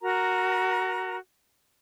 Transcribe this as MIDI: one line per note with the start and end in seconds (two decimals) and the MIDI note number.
0.01 1.17 66
0.01 1.17 70
0.01 1.17 82